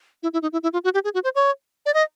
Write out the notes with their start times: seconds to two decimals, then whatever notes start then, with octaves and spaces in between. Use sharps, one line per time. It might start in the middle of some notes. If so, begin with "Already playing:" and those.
0.23 E4
0.33 E4
0.42 D#4
0.53 E4
0.63 E4
0.73 F4
0.84 F#4
0.94 G4
1.04 G#4
1.14 F#4
1.24 C5
1.35 C#5
1.86 D5
1.94 D#5